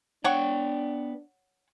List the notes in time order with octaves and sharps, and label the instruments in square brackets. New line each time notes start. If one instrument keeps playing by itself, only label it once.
[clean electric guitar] B3 G5 [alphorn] D4 [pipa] C#5 F#5 C#6